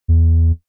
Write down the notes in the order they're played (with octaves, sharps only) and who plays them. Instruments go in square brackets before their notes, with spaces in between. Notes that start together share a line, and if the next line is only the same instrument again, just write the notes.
[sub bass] E2